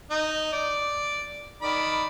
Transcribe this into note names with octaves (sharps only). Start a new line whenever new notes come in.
D#4
D5
D#3 D5 B5